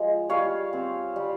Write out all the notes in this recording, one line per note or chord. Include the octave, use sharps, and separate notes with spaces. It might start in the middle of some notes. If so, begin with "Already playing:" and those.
Already playing: F3 G#3
G3 C#5 F5
C4
G3